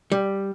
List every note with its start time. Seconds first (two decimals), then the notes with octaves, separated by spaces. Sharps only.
0.12 G3